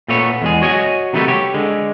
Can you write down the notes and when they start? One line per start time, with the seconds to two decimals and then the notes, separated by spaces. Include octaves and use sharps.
0.08 A#2 A3 B3 C#5
0.42 E2 G#3 G#4
0.62 F#4 C#5 D#5 G5 G#5
1.13 C3 D#3 F#3 G3 A3 B3
1.28 G4 C#5
1.54 D3 G#3